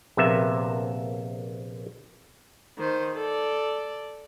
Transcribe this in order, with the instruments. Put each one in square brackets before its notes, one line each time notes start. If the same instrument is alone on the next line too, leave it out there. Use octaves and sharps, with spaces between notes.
[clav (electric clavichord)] A#1 C3 A#3 B3 E5
[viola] D#3 C5
A4 D5